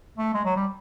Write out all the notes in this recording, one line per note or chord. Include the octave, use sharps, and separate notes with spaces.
A3
G#3
F#3
G3